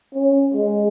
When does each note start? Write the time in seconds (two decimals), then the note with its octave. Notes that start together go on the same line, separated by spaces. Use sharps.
0.14 C#4
0.54 G#3